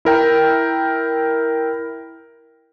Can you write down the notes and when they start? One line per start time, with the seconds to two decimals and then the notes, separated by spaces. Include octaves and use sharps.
0.05 E4 A#4 G5